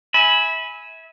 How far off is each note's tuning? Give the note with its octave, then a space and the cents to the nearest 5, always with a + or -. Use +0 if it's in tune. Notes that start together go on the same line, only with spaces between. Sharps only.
E5 -25 G#5 +0 B5 +0